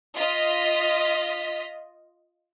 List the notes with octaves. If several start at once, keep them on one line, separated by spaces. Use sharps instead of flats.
F4 D#5 B6